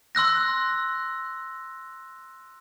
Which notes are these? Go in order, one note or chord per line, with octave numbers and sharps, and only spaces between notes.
C6 E6 F#6 A#6